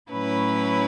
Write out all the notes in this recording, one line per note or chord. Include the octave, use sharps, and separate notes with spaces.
A2 F#3 C#4 E4 B4